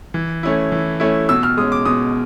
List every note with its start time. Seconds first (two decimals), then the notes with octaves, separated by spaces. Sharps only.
0.14 E3
0.43 A3 C#4 E4
0.72 E3
1.00 A3 C#4 E4
1.29 B2 E6
1.43 F6
1.57 G#3 C#4 D#6
1.72 D6
1.85 B2 D#6